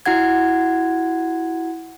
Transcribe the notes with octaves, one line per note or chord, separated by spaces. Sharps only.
E4 F#4 F#5 G#6